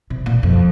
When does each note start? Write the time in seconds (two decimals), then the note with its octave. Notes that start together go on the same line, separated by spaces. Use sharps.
0.10 C3
0.26 A#2
0.43 F2